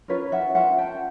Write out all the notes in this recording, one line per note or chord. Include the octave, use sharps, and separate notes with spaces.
C#4 F4 A#4 B4 C#5
E5 F#5
C#4 F4 A#4 E5 F#5
G5 A5